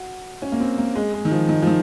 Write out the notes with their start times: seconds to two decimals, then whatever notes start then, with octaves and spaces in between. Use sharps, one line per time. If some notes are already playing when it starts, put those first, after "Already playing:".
Already playing: F#4
0.42 C#4
0.52 A#3
0.60 C4
0.78 A#3
0.95 G#3
1.14 G#3
1.25 D#3
1.31 F3
1.49 D#3
1.62 F3
1.67 D#3